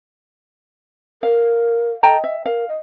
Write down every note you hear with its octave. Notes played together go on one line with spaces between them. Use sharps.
A#4 F5
A4 D#5 G5 A#5
E5
A#4 F5
D#5